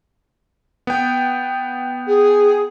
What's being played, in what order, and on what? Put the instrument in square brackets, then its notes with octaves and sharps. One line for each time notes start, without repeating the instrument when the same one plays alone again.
[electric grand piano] B3 G5
[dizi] G#4